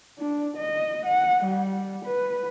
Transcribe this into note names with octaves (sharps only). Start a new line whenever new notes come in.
D4
D#5
F#5
G3
B4